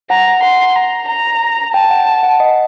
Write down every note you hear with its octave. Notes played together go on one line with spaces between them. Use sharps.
F#5 A#5
F#5 C6
A#5
A#5
G5 A5
F#5
F#5
D#5